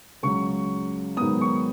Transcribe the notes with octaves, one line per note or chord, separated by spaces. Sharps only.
C#2 C#3 F#3 C#6
G#2 D#3 F#3 B3 D#6
C#6